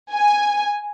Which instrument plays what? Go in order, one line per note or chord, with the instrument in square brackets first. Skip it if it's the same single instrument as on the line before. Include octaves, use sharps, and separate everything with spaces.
[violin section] G#5